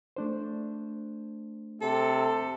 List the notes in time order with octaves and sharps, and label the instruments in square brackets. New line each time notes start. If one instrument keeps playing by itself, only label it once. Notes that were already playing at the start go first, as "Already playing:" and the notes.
[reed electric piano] A3 D4 C5
[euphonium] C3 [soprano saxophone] A4